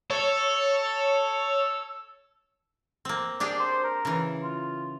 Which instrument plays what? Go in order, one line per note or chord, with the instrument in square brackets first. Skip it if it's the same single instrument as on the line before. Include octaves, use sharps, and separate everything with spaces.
[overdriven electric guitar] A4 [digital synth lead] C#5
[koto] A#3 C4
[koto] D4 G4 G#4 [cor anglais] D5
[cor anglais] C5
A#4
[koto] C#3 E3
[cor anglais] F4